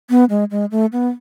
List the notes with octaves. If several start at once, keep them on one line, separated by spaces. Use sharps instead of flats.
B3
G#3
G#3
A3
B3